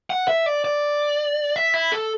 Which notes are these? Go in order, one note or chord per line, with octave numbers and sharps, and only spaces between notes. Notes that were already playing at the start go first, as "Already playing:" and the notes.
F#5
E5
D5
D5
E5
E4
A4